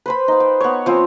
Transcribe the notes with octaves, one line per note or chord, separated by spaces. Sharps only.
B4 C5 B5
D#4 F5
G5
B3 C#5
F3 C4 C#4